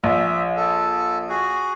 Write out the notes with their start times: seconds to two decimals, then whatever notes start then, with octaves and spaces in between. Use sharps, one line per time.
0.04 A#1 E5
0.56 A4
1.29 F#4 G#4